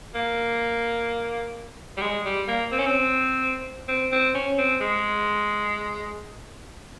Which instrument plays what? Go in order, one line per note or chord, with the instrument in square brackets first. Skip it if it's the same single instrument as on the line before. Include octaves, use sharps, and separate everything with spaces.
[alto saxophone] A#3
G3
G#3
G3
A#3
C4
C#4
C4
C4
C4
C#4
C4
G#3